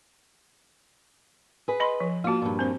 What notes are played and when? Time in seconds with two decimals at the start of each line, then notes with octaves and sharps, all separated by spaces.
1.68 G#4 B4
1.80 D#5 B5 C6
2.00 F3
2.24 A#3 F4 F#4 A5
2.42 G2 A#2
2.59 C4 C5